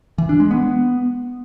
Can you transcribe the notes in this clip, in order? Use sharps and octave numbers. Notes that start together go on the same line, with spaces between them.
E3
D4
G#3
B3